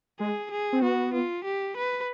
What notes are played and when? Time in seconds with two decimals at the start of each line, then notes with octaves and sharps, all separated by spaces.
0.20 G#3 G#4
0.52 G#4
0.73 C4
0.82 B3 F#4
1.14 F4
1.45 G4
1.77 B4